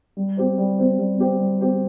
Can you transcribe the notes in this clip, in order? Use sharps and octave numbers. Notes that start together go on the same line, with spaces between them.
G3
C4 G4 C5
G3
C4 G4 C5
G3
C4 G4 C5
G3
C4 G4 C5